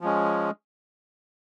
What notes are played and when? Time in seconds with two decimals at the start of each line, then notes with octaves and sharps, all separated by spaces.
0.01 F3 G#3 C#4